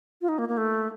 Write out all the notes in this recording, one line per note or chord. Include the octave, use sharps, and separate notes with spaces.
F4
D#4
A#3
A#3
A3